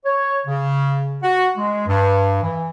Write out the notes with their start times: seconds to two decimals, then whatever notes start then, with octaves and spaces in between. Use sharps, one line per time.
0.05 C#5
0.46 C#3
1.23 F#4
1.57 G#3
1.87 G2
2.42 E3